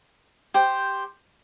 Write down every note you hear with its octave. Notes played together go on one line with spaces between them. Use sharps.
G4 C5 G5